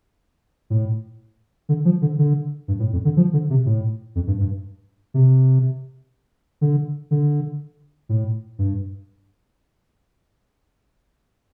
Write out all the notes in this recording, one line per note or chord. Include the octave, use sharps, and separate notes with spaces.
A2
D3
F3
D3
D3
G2
A2
F2
D3
F3
D3
C3
A2
F2
G2
G2
C3
D3
D3
A2
G2